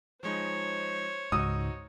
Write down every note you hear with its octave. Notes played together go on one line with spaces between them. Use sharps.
F3 G#3 D#4 C5 C#5
C#2 G#2 D#4 F#4 D#6 E6